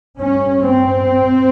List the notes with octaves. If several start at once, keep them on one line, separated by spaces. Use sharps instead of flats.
G2 C#4
C4